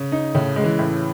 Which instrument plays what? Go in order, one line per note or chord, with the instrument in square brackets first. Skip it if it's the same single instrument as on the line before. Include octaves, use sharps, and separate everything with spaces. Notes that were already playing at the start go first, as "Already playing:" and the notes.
Already playing: [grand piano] C#3
[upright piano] D#4
[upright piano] A2 [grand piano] C#3
[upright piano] G#3
[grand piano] E3
[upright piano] A2